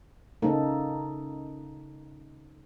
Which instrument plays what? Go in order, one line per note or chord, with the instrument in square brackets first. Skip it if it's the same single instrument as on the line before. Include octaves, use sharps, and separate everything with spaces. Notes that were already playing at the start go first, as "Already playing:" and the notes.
[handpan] C#3 A#3 D#4 A4